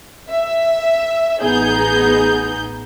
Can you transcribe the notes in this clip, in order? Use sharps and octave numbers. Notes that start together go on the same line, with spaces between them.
E5
A1 B3 D#4 G#4 G6